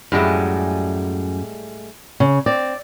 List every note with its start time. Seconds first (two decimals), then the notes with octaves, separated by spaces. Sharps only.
0.12 F#2 A2 G3 G#3
2.20 C#3
2.46 C4 D5